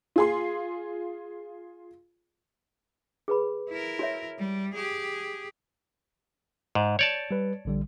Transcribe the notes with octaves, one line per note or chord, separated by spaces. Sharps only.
F4 G#4 C6
G#4 B4 B5
E4 A#4
F#4 C#5 E5
G3
G4 G#4
G#2
C#5 D5 A5 G6
G3 B4
A#1 D3 G3